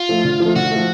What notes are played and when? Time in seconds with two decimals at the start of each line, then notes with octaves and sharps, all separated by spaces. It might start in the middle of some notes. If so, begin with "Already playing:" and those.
Already playing: F4
0.09 F3 A3
0.25 D3
0.40 F3 A3
0.56 D3 F#4
0.71 F3 A3